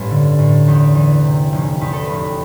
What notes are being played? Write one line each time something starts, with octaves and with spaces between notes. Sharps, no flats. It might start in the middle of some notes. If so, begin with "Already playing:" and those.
Already playing: A1 G2 A4 B4
D3
A1
E2
E3
C3
F1
E2 B4
A4
F1 B4